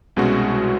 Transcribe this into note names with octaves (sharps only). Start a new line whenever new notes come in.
C2 B2 G#3 C#4 F#4